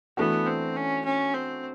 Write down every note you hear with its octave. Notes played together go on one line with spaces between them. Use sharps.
E3 A3 B3 D4 F#4
C4
C#4
C#4
C4